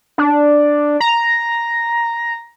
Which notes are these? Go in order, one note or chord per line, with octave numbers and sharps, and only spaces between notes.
D4
A#5